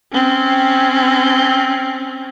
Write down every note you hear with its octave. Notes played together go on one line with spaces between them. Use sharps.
C4 C#4